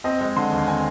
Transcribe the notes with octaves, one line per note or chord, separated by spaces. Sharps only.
C4 D#5
G#3
D3 C6
D#2
C4 G#5